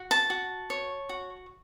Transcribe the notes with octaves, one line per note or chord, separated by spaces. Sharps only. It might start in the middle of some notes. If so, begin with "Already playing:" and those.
Already playing: F#4
A5
F#4
C#5
F#4